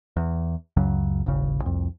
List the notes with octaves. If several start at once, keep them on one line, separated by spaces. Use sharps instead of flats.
E2
C#2 F#2 C#3 F#3
D#1 G#1 C#3
C2 F2